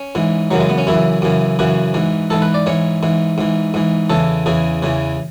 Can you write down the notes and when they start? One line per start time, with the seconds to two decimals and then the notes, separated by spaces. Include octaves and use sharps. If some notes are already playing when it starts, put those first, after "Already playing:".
Already playing: C#4
0.15 G#2 E3
0.51 F#2 C#3 E3 F#3
0.60 G#3
0.69 B3
0.78 C#4
0.87 F#2 C#3 E3 E4
1.22 F#2 C#3 E3
1.59 F#2 C#3 E3 F#4
1.94 G#2 E3
2.30 G#2 E3 A4
2.42 B4
2.54 D5
2.66 G#2 E3 C#5
3.03 G#2 E3
3.38 G#2 E3
3.74 G#2 E3
4.10 E2 C#3 E3 A4
4.46 E2 C#3 E3 G#4
4.82 E2 C#3 E3